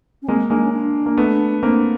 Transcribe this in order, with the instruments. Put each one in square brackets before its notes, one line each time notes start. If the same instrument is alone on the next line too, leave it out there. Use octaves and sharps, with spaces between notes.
[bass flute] C#4
[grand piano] G#3 A#3 [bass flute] C4
[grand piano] G#3 A#3 [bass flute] D4
[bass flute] C#4
D4
[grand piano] A#3
A3 B3
[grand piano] A#3 C4 [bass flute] D4